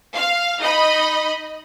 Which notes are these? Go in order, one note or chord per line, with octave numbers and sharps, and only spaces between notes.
F5
D#4 D#5 B5